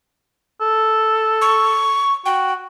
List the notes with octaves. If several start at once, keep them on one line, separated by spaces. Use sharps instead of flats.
A4
C#6
F#4 G5